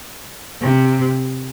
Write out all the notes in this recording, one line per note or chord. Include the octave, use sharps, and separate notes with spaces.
C3